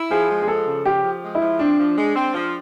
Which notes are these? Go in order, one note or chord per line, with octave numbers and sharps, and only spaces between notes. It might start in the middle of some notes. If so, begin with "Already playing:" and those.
Already playing: E4
F3 G#4
G#3
G#4
F3 A4
C#3
F3 G4
F3
G#3
E4
F3
C4 D4
F3
G#3
C4
F3